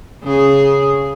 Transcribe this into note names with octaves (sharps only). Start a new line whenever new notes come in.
C#3 G#4